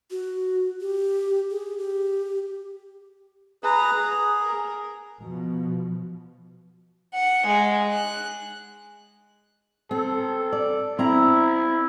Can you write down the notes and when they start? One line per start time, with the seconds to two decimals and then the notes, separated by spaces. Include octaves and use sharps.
0.11 F#4
0.81 G4
1.51 G#4
1.78 G4
3.63 G#4 B4 A#5
3.96 G#4
4.42 A#4
5.20 B2 F3
7.13 F#5
7.46 G#3
7.92 F#6
9.91 C4 A4
10.52 D5
10.99 C4 E4 A#5